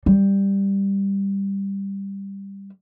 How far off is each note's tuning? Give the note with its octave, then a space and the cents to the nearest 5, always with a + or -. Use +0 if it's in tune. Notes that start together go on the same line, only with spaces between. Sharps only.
G3 +10